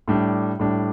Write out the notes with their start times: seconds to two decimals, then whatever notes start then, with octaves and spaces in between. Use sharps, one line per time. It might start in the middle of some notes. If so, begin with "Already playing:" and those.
0.08 A2 G3 D4
0.59 A2 G3 D4